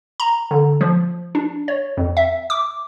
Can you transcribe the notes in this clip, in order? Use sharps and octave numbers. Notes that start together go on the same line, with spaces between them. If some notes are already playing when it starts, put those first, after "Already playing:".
A#5
D3
F3
D4
C#5
F2
E5
D6